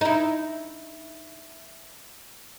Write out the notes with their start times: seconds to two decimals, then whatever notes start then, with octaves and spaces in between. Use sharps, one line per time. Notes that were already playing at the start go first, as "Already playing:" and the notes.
0.01 D#4 E4